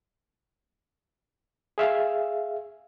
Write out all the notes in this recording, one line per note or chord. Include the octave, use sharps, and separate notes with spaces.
G#4 E5 F5